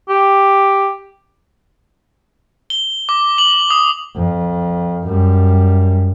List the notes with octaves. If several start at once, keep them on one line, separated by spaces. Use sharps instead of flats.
G4
G7
D6
F#7
D#6
F2
F#2 G3